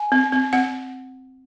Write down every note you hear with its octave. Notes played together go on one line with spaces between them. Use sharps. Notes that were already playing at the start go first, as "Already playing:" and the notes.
Already playing: G#5
C4
C4
C4 F#5